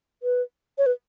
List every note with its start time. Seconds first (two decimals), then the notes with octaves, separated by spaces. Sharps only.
0.23 B4
0.78 C#5
0.86 B4